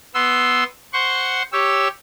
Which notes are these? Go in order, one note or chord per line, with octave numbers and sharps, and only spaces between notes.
B3 C6 E6
C5 F#5 C6 C#6
G4 C#5 E6